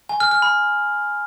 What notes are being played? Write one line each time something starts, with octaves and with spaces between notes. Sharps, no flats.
G#5
F6
F6
B5